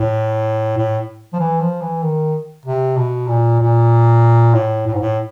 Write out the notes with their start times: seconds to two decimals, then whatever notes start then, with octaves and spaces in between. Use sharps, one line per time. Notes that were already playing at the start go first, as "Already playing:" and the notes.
Already playing: A2
0.77 A2
1.33 F3
1.39 E3
1.60 F3
1.81 E3
2.02 D#3
2.66 C3
2.97 B2
3.28 A#2
3.60 A#2
4.54 A2
4.86 A2
4.93 G#2
5.01 A2